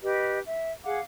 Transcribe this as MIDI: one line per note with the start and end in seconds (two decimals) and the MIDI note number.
0.03 0.38 67
0.03 0.38 71
0.03 0.38 75
0.46 0.70 76
0.84 1.00 68
0.84 1.00 77
0.84 1.00 78
0.84 1.00 86